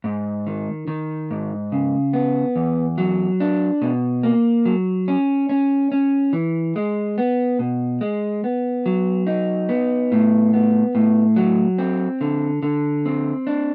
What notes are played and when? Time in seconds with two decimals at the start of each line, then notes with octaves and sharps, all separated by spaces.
0.04 G#2
0.47 D#3
0.88 D#3
1.31 G#2
1.72 C#3
2.13 B3
2.56 E2
2.98 F#3
3.40 D4
3.82 B2
4.23 A#3
4.66 F#3
5.08 C#4
5.49 C#4
5.92 C#4
6.33 E3
6.76 G#3
7.18 B3
7.59 B2
8.01 G#3
8.44 B3
8.86 F#3
9.27 D#4
9.69 B3
10.12 A2
10.53 B3
10.95 A2
11.36 F#3
11.78 C4
12.21 D3
12.63 D3
13.05 C4
13.47 D4